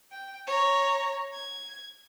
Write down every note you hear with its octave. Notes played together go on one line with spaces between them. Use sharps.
G5
C#5 A#5
G#6